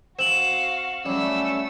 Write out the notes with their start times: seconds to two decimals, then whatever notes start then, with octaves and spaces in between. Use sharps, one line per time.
0.19 C4 F#4 F5 E7 F#7
1.06 F#3 G3 A3 C#4 E6